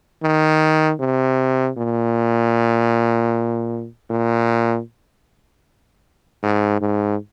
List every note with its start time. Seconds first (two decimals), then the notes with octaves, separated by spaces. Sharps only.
0.23 D#3
1.00 C3
1.78 A#2
4.10 A#2
6.43 G#2
6.81 G#2